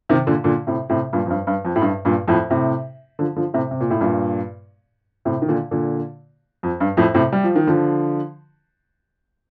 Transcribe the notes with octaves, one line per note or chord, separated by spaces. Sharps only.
C3 D#3
A#2 D3
A#2 D3
A2 C3
A2 C3
G2 A#2
F2
G2
G2
F2
A2
G2
G2 A#2
F2 A2
A2 C3
D3 F3
D3 F3
A2 C3
C3
A#2
A2
G2 A#2
A2 C3
D#3
A#2 D3
A#2 D3
F2
G2
F2 A2
A2 C3
G3
F3
D#3
D3 F3